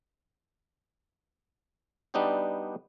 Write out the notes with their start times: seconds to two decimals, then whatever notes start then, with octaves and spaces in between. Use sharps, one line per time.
2.14 G3 B3 D4 D#4 F#4 G4